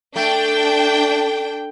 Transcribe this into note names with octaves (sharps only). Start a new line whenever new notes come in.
A3 D4 G5